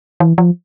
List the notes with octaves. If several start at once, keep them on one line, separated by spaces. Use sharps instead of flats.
E3
F3